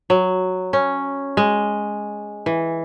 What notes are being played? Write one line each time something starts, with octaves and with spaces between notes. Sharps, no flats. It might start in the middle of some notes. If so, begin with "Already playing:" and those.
F#3
C#4
G#3
E3